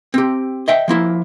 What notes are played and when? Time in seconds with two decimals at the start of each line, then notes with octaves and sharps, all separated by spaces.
0.14 C4 G4
0.68 D#5 E5 G5
0.88 F3 A#3 E4